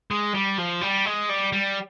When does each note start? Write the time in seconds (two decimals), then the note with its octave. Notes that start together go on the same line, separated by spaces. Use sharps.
0.11 G#3
0.34 G3
0.58 F3
0.81 G3
1.05 G#3
1.29 G3
1.53 G3